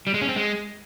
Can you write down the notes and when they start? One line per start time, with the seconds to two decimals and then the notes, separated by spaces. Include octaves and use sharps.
0.07 G3
0.14 G#3
0.21 C#4
0.29 C4
0.36 G#3